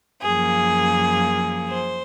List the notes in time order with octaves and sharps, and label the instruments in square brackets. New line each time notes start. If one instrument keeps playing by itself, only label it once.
[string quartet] F#2 F3 A#3 G#4
C5